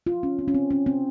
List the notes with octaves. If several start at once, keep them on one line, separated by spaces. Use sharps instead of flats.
F4
C#4
C4
C#4
C4
C#4
C4